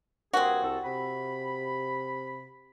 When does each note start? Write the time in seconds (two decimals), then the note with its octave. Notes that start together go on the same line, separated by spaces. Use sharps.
0.33 G2 A#3 C4 F#4 G#4
0.63 C2 A4
0.84 C3 B5